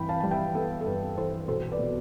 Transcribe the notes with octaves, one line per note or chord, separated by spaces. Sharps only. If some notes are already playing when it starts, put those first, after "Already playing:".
Already playing: G2 E3 G5 B5
F5 A5
G3 A5
E5 G5
B3 A4
A4
G2 B4
E3 A4 C5
B1 A4 C5
B4 D5
B2